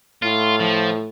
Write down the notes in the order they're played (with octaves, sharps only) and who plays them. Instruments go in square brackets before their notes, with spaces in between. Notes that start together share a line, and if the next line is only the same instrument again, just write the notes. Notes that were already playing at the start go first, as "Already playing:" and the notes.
[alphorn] A2 [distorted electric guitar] F4
[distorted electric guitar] F3